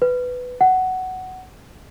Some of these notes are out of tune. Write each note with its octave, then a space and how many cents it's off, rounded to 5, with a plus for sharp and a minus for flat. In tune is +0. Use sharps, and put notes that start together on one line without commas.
B4 +10
F#5 +10